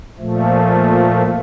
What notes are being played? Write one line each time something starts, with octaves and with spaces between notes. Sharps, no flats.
A#2 F3 A3